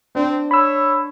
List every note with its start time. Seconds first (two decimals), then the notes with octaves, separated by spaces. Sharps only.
0.15 C4 D4
0.51 C#5 B5 E6